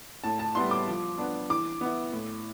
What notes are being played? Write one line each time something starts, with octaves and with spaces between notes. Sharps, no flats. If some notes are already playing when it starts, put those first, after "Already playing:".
A2 A5
A5
G3 B3 E4 C6
D6
F3
B3 D4
E3 D6
B3 E4
A2